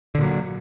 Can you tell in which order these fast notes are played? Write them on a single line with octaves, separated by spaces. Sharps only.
D3 A#2 F#3